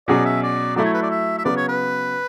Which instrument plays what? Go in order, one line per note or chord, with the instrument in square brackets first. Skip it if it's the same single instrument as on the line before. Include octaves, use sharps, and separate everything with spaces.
[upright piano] B2 F#3 C#4 G#4 [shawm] D5
[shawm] E5
D5
[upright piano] F#3 A3 E4 [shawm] D5
[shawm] C#5
B4
D5
E5
E5
[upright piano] C#3 F#3 B3 [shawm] D5
[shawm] C#5
B4